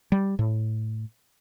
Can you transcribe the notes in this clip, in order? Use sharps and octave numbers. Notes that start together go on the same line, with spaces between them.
G3
A2